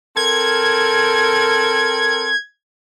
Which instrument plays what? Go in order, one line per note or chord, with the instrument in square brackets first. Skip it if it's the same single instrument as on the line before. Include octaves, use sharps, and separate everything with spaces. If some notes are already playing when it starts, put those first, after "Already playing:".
[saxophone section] C4 A4 A#4 [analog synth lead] G#6